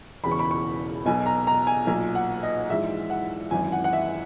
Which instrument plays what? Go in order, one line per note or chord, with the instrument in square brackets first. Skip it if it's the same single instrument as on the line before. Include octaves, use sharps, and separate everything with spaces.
[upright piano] E1 E2 C#3 E3 B5
C#6
B5
C#6
B1 B2 G#5
A#5
A#5
G#5
B1 A#2 G#5
F#5
D#5
A#1 G#2 E3 E5
F#5
G#1 F#2 E3 G#5
F#5
F#5
E5